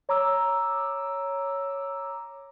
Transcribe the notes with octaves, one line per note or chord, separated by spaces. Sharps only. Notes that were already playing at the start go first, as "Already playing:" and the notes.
C#5 A#5 D6 E6